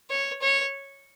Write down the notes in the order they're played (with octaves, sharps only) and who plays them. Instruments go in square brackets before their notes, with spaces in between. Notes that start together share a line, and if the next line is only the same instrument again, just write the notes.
[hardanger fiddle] C#5
C#5